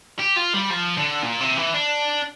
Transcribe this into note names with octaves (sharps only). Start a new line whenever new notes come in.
G4
F4
G3
F3
D3
A#2
C3
E3
D4